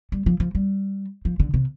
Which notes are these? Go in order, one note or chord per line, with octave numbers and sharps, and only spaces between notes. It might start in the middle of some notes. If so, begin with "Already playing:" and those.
G3
F3
F3
G3
F3
D3
C3